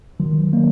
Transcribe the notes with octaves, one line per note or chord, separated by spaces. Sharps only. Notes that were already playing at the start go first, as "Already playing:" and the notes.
D#3 F#3
A#3